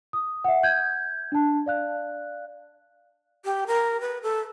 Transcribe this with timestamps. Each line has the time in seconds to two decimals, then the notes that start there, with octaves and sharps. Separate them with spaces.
0.13 D#6
0.44 E5 F#5
0.63 G6 G#6
1.32 D4 A5
1.66 D5 F5 F#6
3.44 G4
3.67 A#4
4.01 B4
4.23 A4